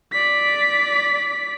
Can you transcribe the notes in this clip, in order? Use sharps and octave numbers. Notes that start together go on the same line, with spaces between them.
D5 B6